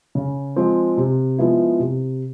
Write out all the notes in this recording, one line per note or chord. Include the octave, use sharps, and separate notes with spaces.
C#3
F3 G#3 C4
C3
F3 G#3 B3 E4
C3